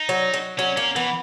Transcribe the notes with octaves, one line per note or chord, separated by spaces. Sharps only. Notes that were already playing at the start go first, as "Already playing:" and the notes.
Already playing: D#4
F#3
F#3
F#3 C#4
A#3 C#4
E3 B3